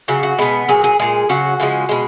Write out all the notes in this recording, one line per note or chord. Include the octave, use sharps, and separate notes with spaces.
C#3 F#3 F#4
F#4
B2 G#3 B3
A#2 F#3 G#4
G#4
A#2 G#3 G#4
C#3 F#3 F#4
C#3 F3 G#3
B2 G#3